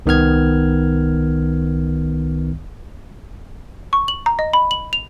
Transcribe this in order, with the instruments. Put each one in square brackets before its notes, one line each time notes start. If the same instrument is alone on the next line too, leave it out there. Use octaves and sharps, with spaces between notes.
[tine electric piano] C2 D#3 B3 F6 G#6
[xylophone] C#6
F#7
A#5
D#5
B5
F#7
F7